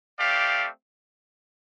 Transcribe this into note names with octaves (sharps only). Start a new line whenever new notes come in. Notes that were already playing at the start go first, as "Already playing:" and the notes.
A3 C4 G4 D5 F5